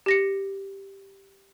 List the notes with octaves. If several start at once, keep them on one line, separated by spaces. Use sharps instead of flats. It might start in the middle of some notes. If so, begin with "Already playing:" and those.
G4 A#6 C#7